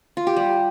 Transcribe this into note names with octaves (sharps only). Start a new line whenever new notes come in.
F4
G4
G3